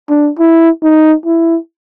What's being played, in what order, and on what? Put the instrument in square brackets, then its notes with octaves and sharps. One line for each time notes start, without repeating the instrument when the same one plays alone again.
[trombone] D4
E4
D#4
E4